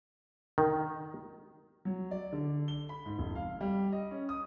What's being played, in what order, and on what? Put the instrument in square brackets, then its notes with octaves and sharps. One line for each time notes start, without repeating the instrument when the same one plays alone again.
[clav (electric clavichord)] D#3
[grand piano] F#3
D5
D3
G7
B5
G#2
F1
F5
G3
D#5
C#4
D#6